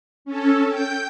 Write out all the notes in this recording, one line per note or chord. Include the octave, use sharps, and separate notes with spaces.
C#4 A4
G5 G6